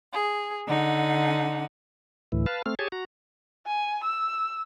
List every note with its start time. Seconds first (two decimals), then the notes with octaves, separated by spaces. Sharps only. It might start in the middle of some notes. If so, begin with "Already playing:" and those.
0.13 G#4
0.66 D3 D#4 F#5
2.32 D2 A2 E3
2.46 B4 F5 A5
2.66 A3 C4 F6
2.79 G4 G#4 C#5 G#5 A5
2.92 F#4 A#5
3.66 G#5
4.04 E6